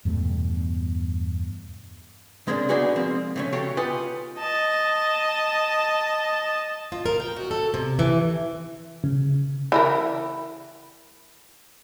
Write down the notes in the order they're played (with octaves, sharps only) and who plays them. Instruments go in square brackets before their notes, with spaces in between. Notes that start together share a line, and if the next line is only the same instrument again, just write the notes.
[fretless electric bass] E2 G2 B2 A3
[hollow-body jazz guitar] C#3 G#3 A#3 C4 D4
D4 D#4 F#4 G#4 B4
F3 G#3 A#3 C4
C#3 A3 C#4
F#4 G4 A4 C#5 F5 G5
F4 G4 B4 D#5 F#5 G#5
[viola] D#5 A5
[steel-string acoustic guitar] F4
A#4
G5
F#4
A4
C3
E3
[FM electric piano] C#3
[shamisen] E3 E4 A#4